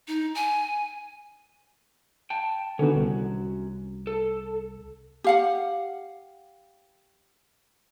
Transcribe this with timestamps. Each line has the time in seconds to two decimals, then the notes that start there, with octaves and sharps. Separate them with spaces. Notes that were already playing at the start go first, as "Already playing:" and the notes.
0.08 D#4
0.35 G#5
2.30 G5 A5
2.79 D3 D#3 B3 C#4 F#4
2.96 C2
4.07 A4
5.24 G4 F5 F#5